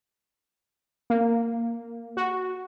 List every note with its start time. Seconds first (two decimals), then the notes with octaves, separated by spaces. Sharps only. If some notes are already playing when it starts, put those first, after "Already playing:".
1.10 A#3
2.17 F#4